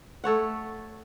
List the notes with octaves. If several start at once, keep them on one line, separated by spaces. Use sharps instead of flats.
A3 A4 C#5 F#5